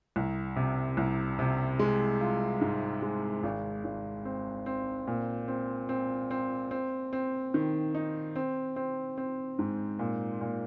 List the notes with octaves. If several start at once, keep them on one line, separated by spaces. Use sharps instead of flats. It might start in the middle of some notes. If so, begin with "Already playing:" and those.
C2
C3
C2
C3
G#3
F4
G#2
G#3
G#1
G#1
C4
C4
A#2
C4
C4
C4
C4
C4
D#3
D#4
C4
C4
C4
G#2
A#2
A#2